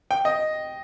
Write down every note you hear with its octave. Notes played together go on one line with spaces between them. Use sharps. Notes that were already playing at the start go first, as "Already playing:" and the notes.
G5
D#5